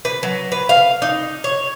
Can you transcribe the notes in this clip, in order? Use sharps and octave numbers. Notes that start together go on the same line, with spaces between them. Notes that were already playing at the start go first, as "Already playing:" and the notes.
B4
F#3
B4
F5
D#4
C#5